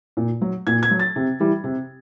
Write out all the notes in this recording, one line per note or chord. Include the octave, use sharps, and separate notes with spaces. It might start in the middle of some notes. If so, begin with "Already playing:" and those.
A#2
F#3
A#2 G#6
G#6
F#3
A6
C3
E3 G3
C3